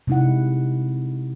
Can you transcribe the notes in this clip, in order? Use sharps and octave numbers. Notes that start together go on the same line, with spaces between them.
C3 G#3 D#4 E4 F#5